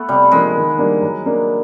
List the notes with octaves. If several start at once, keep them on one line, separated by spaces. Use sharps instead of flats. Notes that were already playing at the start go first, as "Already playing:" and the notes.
Already playing: A3 B3
C3 G3
F3 G#3 A#3 D4
D#3
G3 A#3 D4
F#3
A#3 D4